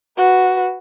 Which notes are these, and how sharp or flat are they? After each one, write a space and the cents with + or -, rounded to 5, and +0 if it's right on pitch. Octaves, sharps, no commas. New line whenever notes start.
F#4 +0 B4 +0